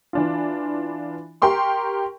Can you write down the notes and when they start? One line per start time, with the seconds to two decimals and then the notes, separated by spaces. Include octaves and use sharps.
0.13 E3 D4 F4
1.42 G4 A#4 G5 C6 C#6